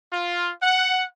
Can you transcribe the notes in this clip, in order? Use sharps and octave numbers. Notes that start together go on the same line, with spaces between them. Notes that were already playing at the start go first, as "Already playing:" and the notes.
F4
F#5